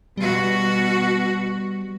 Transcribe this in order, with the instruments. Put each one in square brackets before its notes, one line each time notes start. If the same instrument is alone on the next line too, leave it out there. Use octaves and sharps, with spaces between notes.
[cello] B2 F#4 [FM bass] G3